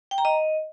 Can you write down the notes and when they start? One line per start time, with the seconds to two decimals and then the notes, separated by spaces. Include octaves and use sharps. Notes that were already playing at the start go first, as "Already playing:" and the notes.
0.11 G5
0.18 A#5
0.25 D#5